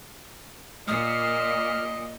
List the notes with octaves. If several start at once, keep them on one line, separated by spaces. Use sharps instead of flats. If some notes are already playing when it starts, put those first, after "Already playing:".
A#2 D#5 D#6 F6